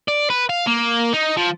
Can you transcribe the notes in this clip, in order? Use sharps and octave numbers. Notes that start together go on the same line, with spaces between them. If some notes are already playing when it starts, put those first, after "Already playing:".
D5
B4
F5
A#3
D#4
F3